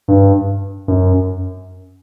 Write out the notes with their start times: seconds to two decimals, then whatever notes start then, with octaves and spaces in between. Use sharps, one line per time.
0.08 G2
0.88 F#2